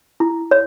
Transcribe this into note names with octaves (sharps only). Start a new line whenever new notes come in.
E4
C#5